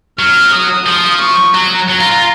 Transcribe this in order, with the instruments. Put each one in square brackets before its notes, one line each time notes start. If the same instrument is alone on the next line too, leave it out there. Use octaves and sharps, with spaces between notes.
[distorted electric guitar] F#3 [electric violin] F6
[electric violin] D#6
[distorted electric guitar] F3 [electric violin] D#6
[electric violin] C#6
[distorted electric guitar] F#3 [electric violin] A#5
[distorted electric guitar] F#3 [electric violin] A#5
[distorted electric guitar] F4
F4